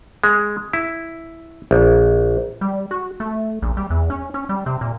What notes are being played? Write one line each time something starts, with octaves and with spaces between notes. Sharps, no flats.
G#3
E4
A#1
G3
F#4
A3
A#1
G3
E2
C#4
C#4
G3
C3
A#2